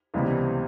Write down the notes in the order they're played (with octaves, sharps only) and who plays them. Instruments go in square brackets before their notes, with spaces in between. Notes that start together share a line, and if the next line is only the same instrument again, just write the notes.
[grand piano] C#2 C3 E3 G3 B3